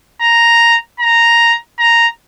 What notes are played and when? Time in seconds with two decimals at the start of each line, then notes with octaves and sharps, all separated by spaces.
0.21 A#5
1.00 A#5
1.79 A#5